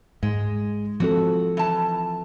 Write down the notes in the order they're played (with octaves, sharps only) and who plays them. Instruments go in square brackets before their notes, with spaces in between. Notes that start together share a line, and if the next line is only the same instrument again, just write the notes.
[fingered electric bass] G#2 [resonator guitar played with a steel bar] G#3
[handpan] F3 C4 A4 [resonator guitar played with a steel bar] F#4
[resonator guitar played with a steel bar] E3 A5